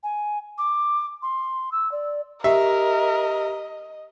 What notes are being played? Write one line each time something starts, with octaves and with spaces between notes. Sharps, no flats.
G#5
D6
C6
E6
D5
G4 A#4 D#5 E5